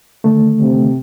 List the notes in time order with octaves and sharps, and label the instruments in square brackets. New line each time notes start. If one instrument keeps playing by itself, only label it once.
[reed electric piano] D3 D#3 A3
[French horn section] C3